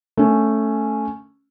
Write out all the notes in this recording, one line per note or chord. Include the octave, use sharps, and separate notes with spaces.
A3 C#4